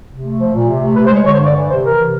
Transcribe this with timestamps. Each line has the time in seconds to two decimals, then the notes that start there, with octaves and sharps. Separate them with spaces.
0.09 C3
0.23 A3
0.38 F3
0.53 A#2
0.67 C3
0.82 A3
0.96 C3 B4
1.06 C5
1.11 G#3 C#5
1.25 D3 C#5
1.35 C5
1.40 G2
1.45 D5
1.55 E3
1.69 C3 C5
1.84 E3 A#4
1.98 C3